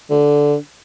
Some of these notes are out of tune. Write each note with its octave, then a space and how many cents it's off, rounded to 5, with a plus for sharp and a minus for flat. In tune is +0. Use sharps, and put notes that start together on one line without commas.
D3 -10